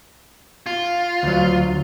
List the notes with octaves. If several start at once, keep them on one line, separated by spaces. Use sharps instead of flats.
F4
D2 F#3